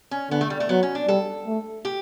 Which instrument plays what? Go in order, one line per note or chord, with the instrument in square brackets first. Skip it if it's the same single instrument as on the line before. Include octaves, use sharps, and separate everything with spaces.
[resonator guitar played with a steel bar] C#4
[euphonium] D3 [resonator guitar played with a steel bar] B3
[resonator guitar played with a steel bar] A3
G3
A3
[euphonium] F#3 [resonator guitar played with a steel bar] B3
[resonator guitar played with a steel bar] C#4
D4
[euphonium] G3 [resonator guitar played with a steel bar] A4
[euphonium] A3
[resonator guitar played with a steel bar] G4